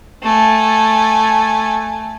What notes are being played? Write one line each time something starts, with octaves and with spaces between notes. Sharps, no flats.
A3 G#5